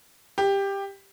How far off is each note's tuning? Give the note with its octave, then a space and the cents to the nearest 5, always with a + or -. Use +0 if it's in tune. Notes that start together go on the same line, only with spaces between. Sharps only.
G4 +10